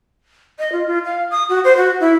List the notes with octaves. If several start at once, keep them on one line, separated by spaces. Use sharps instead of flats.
D#5
F4
F4
F5
D#6
F#4
C5
F#4
E4